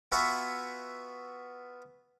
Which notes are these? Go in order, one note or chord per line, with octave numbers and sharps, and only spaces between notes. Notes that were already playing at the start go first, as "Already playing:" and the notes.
B3 F4 F#4 E5 G#5 C#6